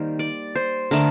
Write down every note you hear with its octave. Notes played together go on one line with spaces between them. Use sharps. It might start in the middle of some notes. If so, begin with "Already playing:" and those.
Already playing: D#3 G3 A#3 C5
D5
C5
D3 A3 A#4